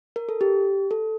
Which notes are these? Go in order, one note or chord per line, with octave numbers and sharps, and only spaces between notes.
A#4
A4
G4
A4